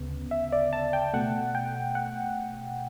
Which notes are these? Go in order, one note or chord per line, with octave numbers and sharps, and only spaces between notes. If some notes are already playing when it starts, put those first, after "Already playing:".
Already playing: D2 C#3 B3
E5
D5
A5
G5
B2 A3 F#5
G5
F#5